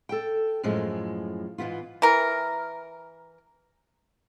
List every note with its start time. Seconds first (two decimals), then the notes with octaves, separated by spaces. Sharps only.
0.09 A4 G5
0.63 F#2 A2 F3 G#3
1.58 G#2 E3 B3 F4
2.02 E3 A#4